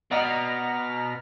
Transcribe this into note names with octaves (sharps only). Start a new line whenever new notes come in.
B2 D5 D#5 F#5 A#5 B5 F6